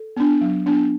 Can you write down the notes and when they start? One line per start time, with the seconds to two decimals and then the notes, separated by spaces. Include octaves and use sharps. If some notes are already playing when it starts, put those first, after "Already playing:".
Already playing: A4
0.17 B3 D4
0.41 F#3
0.66 B3 D4